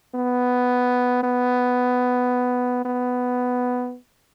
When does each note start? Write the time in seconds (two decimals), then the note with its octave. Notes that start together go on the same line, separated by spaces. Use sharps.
0.15 B3
1.23 B3
2.85 B3